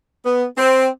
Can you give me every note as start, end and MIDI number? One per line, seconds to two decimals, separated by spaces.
0.24 0.44 59
0.57 0.86 60